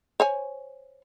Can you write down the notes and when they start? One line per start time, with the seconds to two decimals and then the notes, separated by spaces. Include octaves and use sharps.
0.20 C5 C#5 G#5